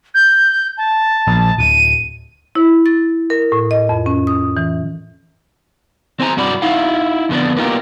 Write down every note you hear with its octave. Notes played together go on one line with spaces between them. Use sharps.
G6
A5
A#1
D1 D#7
E4
A6
A#4
A2
D#5
F2
C#4
D#6
E3
C4 C5 G#5 A#5
C2 G2 D4 F#4 D5 B5
D#4 E4 F5 F#5
F2 D3 B3 D4
A#3 B3 D#4 F4 G4 A#4